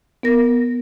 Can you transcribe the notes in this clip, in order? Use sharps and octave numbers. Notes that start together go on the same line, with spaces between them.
B3 A#4 A#6